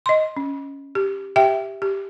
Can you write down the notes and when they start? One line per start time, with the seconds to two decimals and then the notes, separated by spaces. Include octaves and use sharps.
0.06 D#5 C6
0.37 C#4
0.95 G4
1.36 G4 E5 G5
1.82 G4